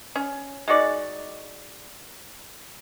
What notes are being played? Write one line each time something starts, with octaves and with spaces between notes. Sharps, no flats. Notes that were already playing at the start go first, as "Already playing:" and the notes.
C#4
G#3 D#4 F#4 D5